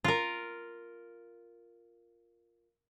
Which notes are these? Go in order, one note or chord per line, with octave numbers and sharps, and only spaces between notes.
F4 A#4